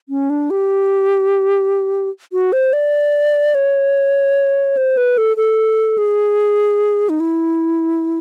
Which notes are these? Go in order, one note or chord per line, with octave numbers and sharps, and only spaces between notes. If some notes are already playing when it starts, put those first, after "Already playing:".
C#4
D4
G4
F#4
C5
D5
C#5
C5
B4
A4
A4
G#4
D#4
E4